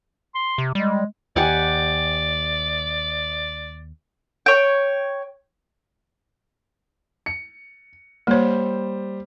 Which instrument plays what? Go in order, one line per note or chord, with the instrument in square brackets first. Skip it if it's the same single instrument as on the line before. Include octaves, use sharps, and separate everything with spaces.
[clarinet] C6
[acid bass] C3
[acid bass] G3 [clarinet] G#3
[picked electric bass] D#2 [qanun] G4 F#5 G#5 [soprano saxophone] D5
[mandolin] C#5 G5
[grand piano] C#7
[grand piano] G3 C5 [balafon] A#3 C#5